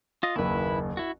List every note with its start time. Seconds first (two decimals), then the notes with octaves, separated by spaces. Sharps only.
0.23 F4 D#5
0.36 F#1 D#2 E4 B4
0.97 E4 F#4